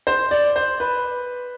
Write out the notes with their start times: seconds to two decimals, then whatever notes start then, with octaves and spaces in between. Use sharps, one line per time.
0.07 C5
0.31 D5
0.56 C5
0.80 B4